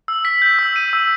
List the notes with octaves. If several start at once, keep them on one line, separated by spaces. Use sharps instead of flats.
E6
B6
G6
E6
D#7
E6